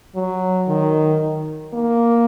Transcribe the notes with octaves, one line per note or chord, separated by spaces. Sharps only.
F#3
D#3
A#3